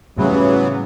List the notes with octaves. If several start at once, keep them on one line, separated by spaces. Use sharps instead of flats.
A2 C#3 E3 F#3 G3 B3